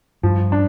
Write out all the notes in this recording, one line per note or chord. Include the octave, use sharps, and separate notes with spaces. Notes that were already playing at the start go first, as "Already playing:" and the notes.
G2 F3
D4